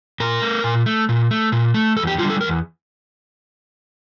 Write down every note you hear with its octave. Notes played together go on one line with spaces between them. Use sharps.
A#2 A#4
A3
A#2
A3
A#2
A3
A#2
A3
E2 A4
G4
D3 G3 F4
A4
E2 A#4